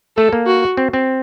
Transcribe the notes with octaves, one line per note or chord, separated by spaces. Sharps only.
A3 A4
A#3
F#4
C4
C4